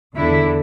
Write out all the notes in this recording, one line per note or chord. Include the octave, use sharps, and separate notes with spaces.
E2 D3 E4